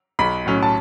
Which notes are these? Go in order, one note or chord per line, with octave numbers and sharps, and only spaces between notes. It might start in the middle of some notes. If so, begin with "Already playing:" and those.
B1 B5
A2 F#3 C#4
A5